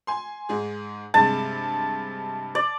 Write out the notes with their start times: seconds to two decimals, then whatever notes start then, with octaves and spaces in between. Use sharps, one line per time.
0.07 G#5 C6
0.49 G#2 G#3 G#4
1.14 G2 C3 G#3 A5
2.55 D5